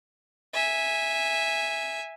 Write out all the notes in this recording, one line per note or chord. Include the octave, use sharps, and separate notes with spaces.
E5 G#5